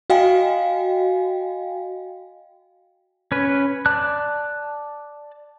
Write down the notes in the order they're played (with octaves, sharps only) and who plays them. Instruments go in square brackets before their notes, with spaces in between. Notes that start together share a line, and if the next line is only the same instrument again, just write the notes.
[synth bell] F#4 D#5 F5 G5 G#5
[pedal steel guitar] C#4 B4
D5 A5 F#6